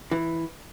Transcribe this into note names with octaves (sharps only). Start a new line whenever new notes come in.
E3